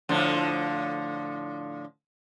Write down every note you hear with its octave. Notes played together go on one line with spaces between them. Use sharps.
A2 D3 F3